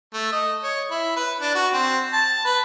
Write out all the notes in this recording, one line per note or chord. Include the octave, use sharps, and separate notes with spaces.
A3
D#5
C#5
E4
B4
D4
F#4
C4
A5
B4